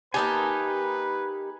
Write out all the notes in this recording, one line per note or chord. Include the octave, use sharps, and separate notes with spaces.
A#3 D#4 G4 B4 G#5 A5